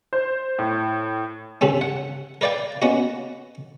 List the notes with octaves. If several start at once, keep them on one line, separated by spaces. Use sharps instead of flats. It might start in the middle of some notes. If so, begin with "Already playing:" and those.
C5
A2
C2 G2 C#3 C4 C#4
F#5
A#4 B4 D5 F5 G5
A#3 B3 C#4 D#4 F#4